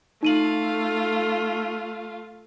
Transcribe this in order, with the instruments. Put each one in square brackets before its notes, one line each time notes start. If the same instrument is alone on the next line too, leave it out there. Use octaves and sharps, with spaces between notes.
[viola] A3 F4 [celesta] D#4 D#7 F#7